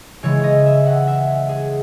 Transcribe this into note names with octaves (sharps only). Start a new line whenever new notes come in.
C#3 E3 G#3 C#5
D#5
E5
F#5
E5
G#4